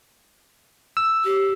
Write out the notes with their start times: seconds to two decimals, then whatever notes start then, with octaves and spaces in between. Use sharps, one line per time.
0.97 E6
1.25 G4